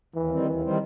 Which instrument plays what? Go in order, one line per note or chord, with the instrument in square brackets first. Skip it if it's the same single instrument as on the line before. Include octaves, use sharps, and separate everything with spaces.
[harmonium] D#2 [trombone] E3
[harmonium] D#3 G3 C4
[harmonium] D#2 [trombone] E3
[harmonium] D#3 G3 C4